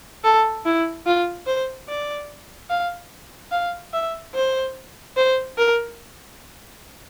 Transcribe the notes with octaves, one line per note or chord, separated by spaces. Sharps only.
A4
E4
F4
C5
D5
F5
F5
E5
C5
C5
A#4